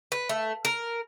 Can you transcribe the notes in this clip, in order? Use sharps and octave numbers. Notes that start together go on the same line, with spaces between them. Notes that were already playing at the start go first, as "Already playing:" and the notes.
B4
A3
A#4